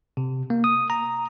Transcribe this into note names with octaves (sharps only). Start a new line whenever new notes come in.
C3
A#3
D#6
A#5